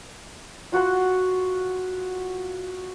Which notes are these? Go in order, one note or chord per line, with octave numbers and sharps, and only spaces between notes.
F4 F#4 F#5 C6